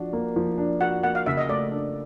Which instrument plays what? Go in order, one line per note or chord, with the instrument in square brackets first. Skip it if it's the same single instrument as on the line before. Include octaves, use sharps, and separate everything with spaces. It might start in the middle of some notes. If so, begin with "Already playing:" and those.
Already playing: [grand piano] F3 D4 F#4
A#3
F3
D4
[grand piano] F#4 [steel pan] F#5
[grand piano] A#3 [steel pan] F#5
[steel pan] F5
[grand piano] C#3 [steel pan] E5
[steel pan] D#5
[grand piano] A3 [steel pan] D5
[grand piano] D4